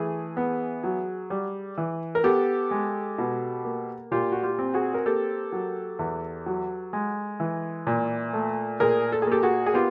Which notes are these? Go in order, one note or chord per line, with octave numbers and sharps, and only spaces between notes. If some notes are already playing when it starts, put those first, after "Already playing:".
Already playing: E3 A3 G#4
B3
F#3
G3
E3
A#4
B3 G4 A4
G#3
B2
A#3
A#2 F4 G4
F#4
F4 G4
C4
F#4 G#4
A#4
A#3 G4 A4
F#3
E2
F#3
G#3
E3
A#2
A3
A#2 G#4 A#4
A4
G#4
A#3 G4 A4
F#4 G#4
G#4
B3 F4 G4